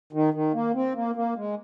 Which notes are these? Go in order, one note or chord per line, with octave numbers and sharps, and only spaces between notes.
D#3
D#3
A#3
C4
A#3
A#3
G#3